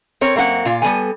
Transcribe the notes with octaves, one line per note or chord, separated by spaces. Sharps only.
C4 A#4 C#5
F#2 A#3 C4 F#4 F#5
A#2 F4
G3 B3 A4 G#5